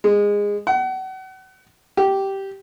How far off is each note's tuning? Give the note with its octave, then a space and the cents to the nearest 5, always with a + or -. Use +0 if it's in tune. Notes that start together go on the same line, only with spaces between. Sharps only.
G#3 -20
F#5 +35
G4 -10